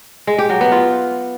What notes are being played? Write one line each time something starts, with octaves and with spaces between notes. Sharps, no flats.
G#3
G4
F#3
B3
F4